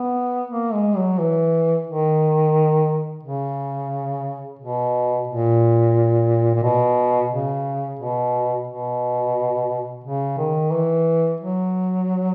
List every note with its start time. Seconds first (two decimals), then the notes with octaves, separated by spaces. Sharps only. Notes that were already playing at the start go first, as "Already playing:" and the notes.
Already playing: B3
0.50 A#3
0.74 G#3
0.96 F#3
1.19 E3
1.87 D#3
3.23 C#3
4.59 B2
5.28 A#2
6.55 A#2
6.63 B2
7.31 C#3
7.99 B2
8.68 B2
10.04 C#3
10.38 D#3
10.72 E3
11.40 F#3